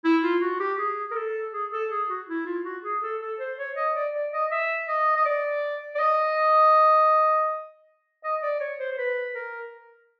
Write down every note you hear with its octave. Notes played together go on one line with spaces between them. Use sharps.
E4
F4
F#4
G4
G#4
A#4
A4
G#4
A4
G#4
F#4
E4
F4
F#4
G#4
A4
A4
C5
C#5
D#5
D5
D5
D#5
E5
D#5
D#5
D5
D5
D#5
D#5
D5
C#5
C5
C5
B4
A#4